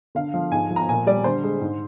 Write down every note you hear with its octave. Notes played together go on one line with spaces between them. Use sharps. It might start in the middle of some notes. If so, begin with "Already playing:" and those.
D3 F5
F3
G#2 G#5
F3
A#5
A#2 G#5
G3 D5
D3 C5
G#3
G#2